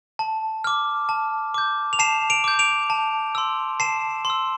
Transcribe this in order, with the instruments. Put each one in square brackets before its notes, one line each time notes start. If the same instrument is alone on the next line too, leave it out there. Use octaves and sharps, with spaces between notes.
[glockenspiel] A5
D6 F6
A5
D6 G6
F7
A5 C7 E7
D7 F7
D6 G6
D7 F7
A5
C6 E6
A5 C7 E7
C6
E6